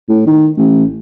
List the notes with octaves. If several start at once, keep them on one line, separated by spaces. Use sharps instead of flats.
A2
D#3
A1